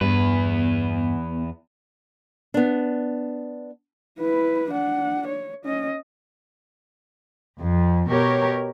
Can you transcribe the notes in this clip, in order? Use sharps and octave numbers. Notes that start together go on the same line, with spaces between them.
E2 G2 B3 B4
B3 D4
E4 B4
D4 F#5
C#5
C#4 D#5
F2
B2 G4 A#4 C#5